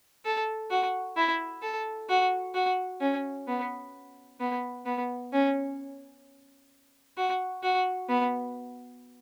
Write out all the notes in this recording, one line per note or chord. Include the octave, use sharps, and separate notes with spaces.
A4
F#4
E4
A4
F#4
F#4
C#4
B3
B3
B3
C#4
F#4
F#4
B3